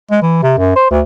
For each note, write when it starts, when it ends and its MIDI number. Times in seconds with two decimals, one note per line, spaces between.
0.11 0.21 56
0.22 0.41 52
0.43 0.55 48
0.57 0.74 42
0.76 0.87 72
0.90 1.01 38